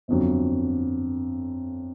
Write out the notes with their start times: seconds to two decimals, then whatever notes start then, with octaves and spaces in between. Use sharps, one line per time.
0.08 G1 F2 D3 F#3